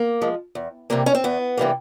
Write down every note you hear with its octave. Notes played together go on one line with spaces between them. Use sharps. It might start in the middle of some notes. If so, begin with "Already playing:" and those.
Already playing: A#3
F3 G#3
E2
C3 E3 G3 A#3
C#4
C4
E2 B3
C3 E3 G3 A#3